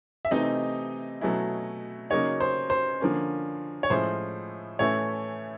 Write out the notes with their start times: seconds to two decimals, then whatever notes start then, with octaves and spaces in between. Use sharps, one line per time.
0.25 E5
0.31 C3 E3 A3 C4 D#4 D#5
1.21 B2 F#3 A3 C#4 E4
2.10 C#3 F#3 A#3 D#4 C#5
2.40 C5
2.70 C5
3.00 D3 F3 A#3 C#4
3.83 C#5
3.90 A2 F3 G#3 C#4 E4 C5
4.79 A2 E3 A3 C#4 E4 C#5